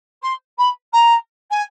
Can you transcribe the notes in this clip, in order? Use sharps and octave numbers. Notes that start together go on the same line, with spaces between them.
C6
B5
A#5
G#5